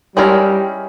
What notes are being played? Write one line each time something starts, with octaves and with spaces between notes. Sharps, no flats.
G3 G#3 C#4 E4 A#4